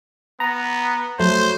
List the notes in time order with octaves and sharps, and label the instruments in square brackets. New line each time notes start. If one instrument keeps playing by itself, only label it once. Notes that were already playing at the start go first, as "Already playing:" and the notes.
[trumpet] B3 [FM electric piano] A#5
[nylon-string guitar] F#3 [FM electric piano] A3 [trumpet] C5